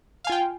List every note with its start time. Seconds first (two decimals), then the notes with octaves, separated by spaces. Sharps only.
0.24 F5
0.27 G#5
0.30 F4
0.32 G5